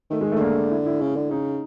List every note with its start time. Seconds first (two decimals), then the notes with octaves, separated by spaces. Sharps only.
0.11 D#3 A3
0.21 G#3
0.32 A3
0.36 D#3
0.41 D3 A#3
0.71 E4
0.86 E4
1.01 C#3
1.16 D3
1.30 C#3 D#4